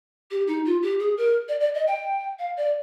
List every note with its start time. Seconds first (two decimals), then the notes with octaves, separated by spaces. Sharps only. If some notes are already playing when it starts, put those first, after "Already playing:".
0.31 G4
0.47 D#4
0.65 F4
0.82 G4
0.99 G#4
1.17 A#4
1.48 D5
1.60 D5
1.74 D#5
1.87 G5
2.39 F5
2.57 D5